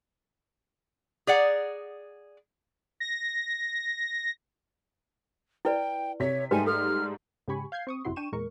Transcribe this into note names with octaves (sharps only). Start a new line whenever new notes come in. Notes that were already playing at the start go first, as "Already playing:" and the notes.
G#4 D5 F#5 A#5
A#6
E4 B4 D5 G5
C3 C#5 B6
G#2 G3 A3 B4 G5 G#5
A4 F6
G#2 C#3 G4 G#5 B5 C#6
F5 G6 G#6 C7
C4 C#6 D#6
G1 F2 C3 E4 F#4 C6
D4 G5 C#6 D#7 E7
E2 A#2 G#3 A#4 C#6